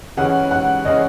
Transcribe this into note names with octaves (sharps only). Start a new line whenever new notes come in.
C#3 E3 G#3 C#4 G#4 F#5
F#5
C#3 E3 G#3 C#4 G#4 D#5